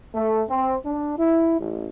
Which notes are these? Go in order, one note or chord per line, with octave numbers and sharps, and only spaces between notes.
A3
C4
D4
E4
A1